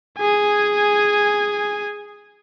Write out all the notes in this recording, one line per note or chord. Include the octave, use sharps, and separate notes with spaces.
G#4 G#5